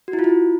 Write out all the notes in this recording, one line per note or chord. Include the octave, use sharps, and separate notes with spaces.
F#4
E4
F4
E4